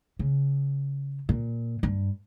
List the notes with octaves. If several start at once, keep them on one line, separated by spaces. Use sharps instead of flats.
C#3
A#2
G2